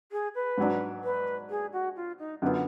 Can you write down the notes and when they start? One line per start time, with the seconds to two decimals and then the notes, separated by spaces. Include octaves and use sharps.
0.12 G#4
0.35 B4
0.58 G#2 F#3 D4
1.04 B4
1.50 G#4
1.73 F#4
1.96 F4
2.19 D#4
2.42 F#2 D3 F#3 B3 F4